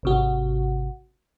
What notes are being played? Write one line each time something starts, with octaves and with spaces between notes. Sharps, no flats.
G#1 C3 F#4